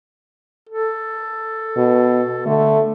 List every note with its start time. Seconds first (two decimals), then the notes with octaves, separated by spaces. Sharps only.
0.69 A4
1.77 B2
2.46 D3 A3